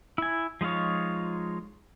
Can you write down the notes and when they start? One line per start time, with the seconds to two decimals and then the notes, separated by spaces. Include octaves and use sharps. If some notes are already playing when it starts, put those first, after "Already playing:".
0.18 E4 G#5
0.61 F3 G#3 D#4 F4 C#5